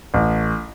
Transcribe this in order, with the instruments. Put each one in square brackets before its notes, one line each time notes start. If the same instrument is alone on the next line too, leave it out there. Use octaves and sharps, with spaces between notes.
[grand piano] A1